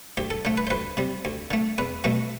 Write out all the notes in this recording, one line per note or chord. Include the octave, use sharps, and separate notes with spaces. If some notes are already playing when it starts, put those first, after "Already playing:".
D2 G4
A4
D3 A3 C5
B4
C5
D2 B4
C3 G3
D2
D3 A3
E2 B4
B2 F#3 A3